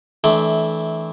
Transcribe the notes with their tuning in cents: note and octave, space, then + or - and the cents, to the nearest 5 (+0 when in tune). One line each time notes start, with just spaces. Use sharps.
E3 -20 A3 -30 D4 +5